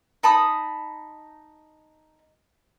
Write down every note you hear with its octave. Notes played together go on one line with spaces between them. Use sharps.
D#4 A5 B5 D#6